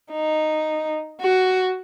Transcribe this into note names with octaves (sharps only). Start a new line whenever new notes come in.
D#4
F#4